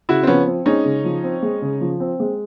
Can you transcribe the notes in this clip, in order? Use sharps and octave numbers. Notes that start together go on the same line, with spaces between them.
C#3 E4 F#4
C4
F3 B3 C#4
C4
G#3 C#4 D#4
C#3
F3
C4
G#3
C#3
F3
C4
G#3